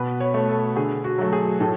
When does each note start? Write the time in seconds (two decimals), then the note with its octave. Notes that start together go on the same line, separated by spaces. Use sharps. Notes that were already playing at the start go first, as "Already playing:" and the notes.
Already playing: B2 B4
0.20 C#5
0.34 A3
0.49 A4
0.76 D3 G#4
1.04 F#4
1.18 F#3 A3
1.33 G#4
1.60 A2 A4